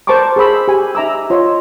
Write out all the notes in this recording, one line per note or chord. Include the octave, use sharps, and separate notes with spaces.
A#4 C5 A5 A#5 C#6 D6
G#4 A#4 C5 B5 E6
G4 G#5
D#4 E5 A#5 D6 E6
F4 C#5 D#5 C6